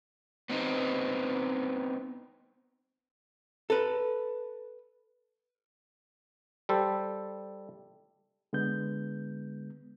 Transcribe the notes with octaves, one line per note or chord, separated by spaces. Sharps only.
B3 C4 D#4
A4 B4
G3 A4 C5
D3 G#3 B3 G6